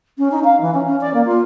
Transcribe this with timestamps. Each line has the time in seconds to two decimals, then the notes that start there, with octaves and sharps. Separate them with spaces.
0.18 C#4
0.31 D#4
0.44 F5
0.60 E3
0.74 C#4
0.86 C#4
1.00 D5
1.13 A#3
1.25 F4